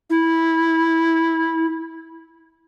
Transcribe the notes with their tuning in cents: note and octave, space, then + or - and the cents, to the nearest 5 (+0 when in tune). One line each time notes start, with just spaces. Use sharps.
E4 -10